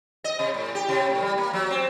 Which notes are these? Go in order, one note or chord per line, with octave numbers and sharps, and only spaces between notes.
D#5
C3
A2
G4
C3
A2
G3
A#3
F#3
C4